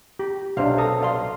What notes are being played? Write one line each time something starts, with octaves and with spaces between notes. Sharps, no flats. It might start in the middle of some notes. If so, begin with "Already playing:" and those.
G4
B1 C3 D4 C5 F5
A4 A#5 D#6
D5 F5 C6